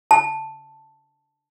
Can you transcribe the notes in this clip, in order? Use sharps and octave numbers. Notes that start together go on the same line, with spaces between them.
A5